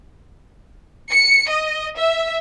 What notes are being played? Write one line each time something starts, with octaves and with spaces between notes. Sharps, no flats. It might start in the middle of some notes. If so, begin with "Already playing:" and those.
C#7
D#5
E5